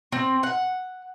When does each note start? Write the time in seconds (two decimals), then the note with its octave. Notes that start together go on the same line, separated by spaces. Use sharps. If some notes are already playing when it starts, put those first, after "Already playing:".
0.12 C4
0.43 F#5